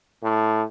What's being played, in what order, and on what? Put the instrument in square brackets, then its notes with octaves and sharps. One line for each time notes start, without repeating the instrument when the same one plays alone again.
[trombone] A2